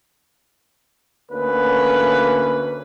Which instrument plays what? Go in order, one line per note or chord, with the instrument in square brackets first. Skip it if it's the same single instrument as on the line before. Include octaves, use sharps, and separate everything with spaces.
[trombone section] D2 A#3 C#4 B4